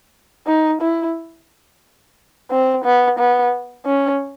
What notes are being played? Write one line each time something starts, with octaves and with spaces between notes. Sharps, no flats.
D#4
E4
C4
B3
B3
C#4